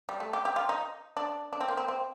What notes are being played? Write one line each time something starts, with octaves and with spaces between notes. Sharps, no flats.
G3
A3
G4
G4
F4
D#4
D4
D4
C4
A#3
C4
C4